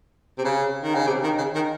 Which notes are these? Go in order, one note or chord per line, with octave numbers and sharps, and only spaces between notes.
C3
C#3
D#3
C#3
C3
D#3
C#3
D#3